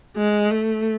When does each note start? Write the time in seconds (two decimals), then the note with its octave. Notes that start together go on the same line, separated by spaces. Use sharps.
0.17 G#3
0.50 A3